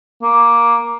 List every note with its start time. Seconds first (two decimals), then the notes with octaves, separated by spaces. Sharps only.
0.22 A#3